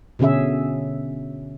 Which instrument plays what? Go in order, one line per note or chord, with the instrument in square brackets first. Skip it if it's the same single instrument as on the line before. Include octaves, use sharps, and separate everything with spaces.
[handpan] B2 D3 C#4 G#4 E5